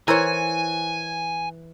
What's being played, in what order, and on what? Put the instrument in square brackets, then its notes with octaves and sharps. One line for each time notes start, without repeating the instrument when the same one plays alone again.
[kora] E3 [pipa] A#4 C5 C#5 [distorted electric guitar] G#5